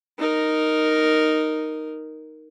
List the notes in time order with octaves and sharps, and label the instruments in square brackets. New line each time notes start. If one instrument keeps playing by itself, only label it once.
[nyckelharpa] D#4 A#4